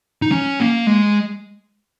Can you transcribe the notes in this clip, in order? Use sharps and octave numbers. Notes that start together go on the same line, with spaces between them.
D#4
C#4
A#3
G#3